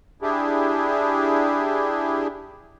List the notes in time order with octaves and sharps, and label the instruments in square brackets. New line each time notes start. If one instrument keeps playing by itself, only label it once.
[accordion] D4 E4 G4 G#4